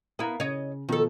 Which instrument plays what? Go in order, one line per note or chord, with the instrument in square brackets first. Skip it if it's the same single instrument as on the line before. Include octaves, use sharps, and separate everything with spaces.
[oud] B3 E4 [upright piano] A#4 F5 A#5
[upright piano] C#3 [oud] C#5 D#5
[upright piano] B2 F3 [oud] D#3 A4